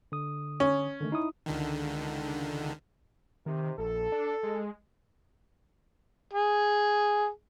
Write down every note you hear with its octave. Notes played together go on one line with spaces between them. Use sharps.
D3 D#6
C#4
D3 D#3 A3
D#4 E4 D#6
C#2 D3 D#3
C3 D#3
A#1 A4
D4
G#3
G#4